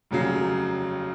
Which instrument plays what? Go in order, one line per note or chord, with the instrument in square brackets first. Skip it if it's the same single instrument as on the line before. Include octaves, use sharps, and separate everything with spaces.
[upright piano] F1 D#2 C#3 F#3 C7